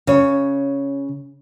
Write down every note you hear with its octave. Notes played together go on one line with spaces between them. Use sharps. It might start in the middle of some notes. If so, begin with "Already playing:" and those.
C#3 C#5